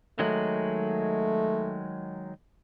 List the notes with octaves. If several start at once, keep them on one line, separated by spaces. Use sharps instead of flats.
D#3 F#3 G#3 A3